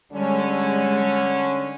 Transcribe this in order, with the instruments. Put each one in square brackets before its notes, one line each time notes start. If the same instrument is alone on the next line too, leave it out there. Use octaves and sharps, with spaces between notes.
[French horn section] D3 C#4 [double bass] G3 G#3